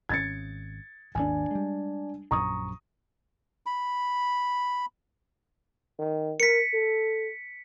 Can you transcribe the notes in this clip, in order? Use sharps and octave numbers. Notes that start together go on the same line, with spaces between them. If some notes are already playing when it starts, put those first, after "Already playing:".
G#1 C#3 C#4 G#6 A6 C#7
G#1 D#2 D#3 D4 G#5
G3 G#3
A#1 F#2 F3 A#5 C#6 D#6
B5
D#3
A#4 B6 C#7
A4